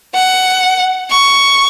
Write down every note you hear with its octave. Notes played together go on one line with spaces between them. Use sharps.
F#5
C#6